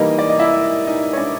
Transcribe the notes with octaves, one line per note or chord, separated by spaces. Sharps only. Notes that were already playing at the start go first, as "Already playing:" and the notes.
Already playing: E3 G3 A#3 D#4 D#5
D5
D#5
E4 E5
D#4 D#5
C#5
D4 D5